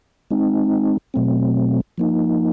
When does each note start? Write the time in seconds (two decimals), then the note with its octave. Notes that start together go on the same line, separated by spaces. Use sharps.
0.31 G#3 C4 D#4
1.14 B2 F#3 A3 C4
1.98 F3 A#3 D#4